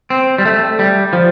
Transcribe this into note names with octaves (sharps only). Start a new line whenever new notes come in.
C4
G3
A3
G3
F3